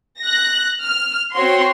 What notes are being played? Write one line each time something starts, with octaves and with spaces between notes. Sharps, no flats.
F#6 A#6
F6
C4 F#4 C#5 C6